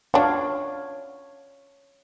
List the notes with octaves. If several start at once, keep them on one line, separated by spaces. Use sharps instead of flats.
D4 F#4 C#5 F5